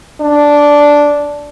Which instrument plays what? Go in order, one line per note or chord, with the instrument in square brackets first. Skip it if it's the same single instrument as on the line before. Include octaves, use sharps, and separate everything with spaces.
[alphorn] D4